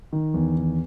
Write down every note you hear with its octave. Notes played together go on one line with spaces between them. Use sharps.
D#3
E2
D#3